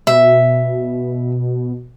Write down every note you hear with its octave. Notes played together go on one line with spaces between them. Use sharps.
B2 E5